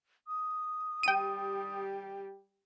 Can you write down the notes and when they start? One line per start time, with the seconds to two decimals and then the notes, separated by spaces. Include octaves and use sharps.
0.27 D#6
1.03 G3 G4 G5 D#7